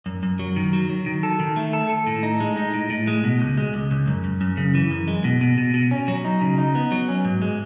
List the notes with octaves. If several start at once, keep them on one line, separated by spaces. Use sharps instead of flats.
F#2
F#2
F#3
D#3
F#3
F#3
D#3
A4
D#3
A3
A4
A4
A2
D#4
G#3
D#4
A2
A2
G#3
B2
C#2
G#3
C#2
C#2
F#2
F#2
F#2
C#3
E3
F#2
G#3
B2
B2
B2
B2
C#4
F#3
D#4
C#3
D#4
B3
F#3
C#4
G#2
G#3